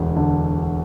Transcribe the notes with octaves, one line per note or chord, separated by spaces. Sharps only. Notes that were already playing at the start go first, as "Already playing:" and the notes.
Already playing: E1 D2
D3